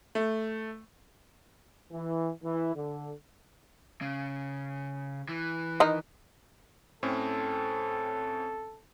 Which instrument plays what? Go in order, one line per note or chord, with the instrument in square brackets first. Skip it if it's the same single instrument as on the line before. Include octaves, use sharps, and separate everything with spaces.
[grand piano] A3
[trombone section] E3
E3
D3
[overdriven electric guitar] C#3
E3
[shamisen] D#3 D#4
[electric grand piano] A2 C4 C#4 [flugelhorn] A4